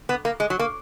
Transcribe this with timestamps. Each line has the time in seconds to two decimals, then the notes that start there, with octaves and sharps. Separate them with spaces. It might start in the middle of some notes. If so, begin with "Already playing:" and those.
0.09 B3
0.25 A#3
0.40 G#3
0.50 F#3
0.59 A#3